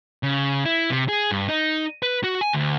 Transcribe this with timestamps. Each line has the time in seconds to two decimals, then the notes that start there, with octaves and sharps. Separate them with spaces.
0.23 C#3
0.65 E4
0.90 C3
1.09 G#4
1.31 G2
1.49 D#4
2.03 B4
2.24 F#4
2.41 G#5
2.53 D2